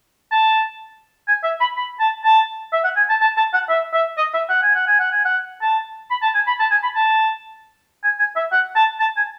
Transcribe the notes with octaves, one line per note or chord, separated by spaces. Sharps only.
A5
G#5
E5
B5
B5
A5
A5
E5
F#5
G#5
A5
A5
A5
F#5
E5
E5
D#5
E5
F#5
G#5
F#5
G#5
F#5
G#5
F#5
A5
B5
A5
G#5
B5
A5
G#5
B5
A5
G#5
G#5
E5
F#5
A5
A5
G#5